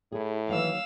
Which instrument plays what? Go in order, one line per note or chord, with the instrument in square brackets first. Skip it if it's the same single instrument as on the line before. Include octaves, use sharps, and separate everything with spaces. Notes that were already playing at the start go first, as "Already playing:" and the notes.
[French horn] A2 [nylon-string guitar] E4 G#4
[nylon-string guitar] D#3 F#3 A#3 [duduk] E3 [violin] F5 E6